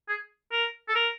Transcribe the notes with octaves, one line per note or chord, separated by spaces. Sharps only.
G#4
A#4
A4
A#4